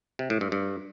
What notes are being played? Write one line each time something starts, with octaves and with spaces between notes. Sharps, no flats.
C3
A2
G2
G2